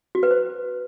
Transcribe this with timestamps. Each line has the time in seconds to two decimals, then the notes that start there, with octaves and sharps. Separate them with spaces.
0.15 F#4
0.23 B4
0.31 C5